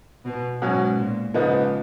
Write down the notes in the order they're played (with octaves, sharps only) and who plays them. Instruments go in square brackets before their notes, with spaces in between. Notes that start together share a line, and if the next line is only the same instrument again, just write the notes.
[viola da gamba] B2
[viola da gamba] G#2 [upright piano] B2 F#3 C#4
[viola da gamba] A#2
[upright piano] G#2 F3 B3 D#4 [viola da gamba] C#3